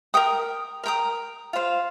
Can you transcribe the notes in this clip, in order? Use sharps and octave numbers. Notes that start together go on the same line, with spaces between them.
A#4 G5 D#6
A#4 G5 A#5 D#6
F4 C5 F5